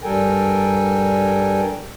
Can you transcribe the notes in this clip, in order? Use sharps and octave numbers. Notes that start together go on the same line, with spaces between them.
G2 G3 A4 A#4 G5 G#5